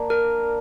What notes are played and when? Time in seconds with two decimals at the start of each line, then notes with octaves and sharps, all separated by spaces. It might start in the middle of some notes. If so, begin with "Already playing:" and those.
Already playing: A#3 D4
0.10 A#4